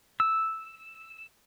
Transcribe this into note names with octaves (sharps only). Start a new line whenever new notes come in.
E6